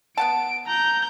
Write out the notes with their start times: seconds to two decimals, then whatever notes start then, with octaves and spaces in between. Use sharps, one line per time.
0.17 B3 F#5 A5 D7
0.67 A#5 G6